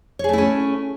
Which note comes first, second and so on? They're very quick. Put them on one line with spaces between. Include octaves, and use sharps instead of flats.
C#5 G#4 A3 E4 C#4